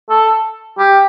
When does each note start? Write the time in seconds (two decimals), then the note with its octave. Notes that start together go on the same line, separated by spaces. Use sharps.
0.10 A4
0.78 G4